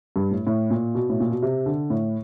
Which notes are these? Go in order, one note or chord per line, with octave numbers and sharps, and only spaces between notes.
G2
A2
A2
A#2
B2
A2
A#2
B2
C3
D3
A2